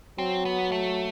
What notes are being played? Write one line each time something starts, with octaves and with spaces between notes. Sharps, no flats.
F#3 C4
B3
A3